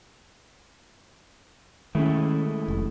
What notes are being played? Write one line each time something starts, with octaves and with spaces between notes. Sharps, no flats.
D#3 G#3 A3 C#4 E4
F1